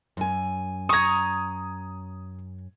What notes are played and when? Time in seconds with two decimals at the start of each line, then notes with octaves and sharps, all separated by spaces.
0.17 F#2 G#5
0.89 A#5 C#6 D#6 G#6